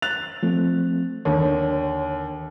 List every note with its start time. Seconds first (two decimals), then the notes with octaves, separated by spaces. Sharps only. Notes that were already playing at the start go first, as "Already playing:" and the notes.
0.02 F#6 A6 F7
0.43 F3 A3 C4
1.25 D#2 D3 C#5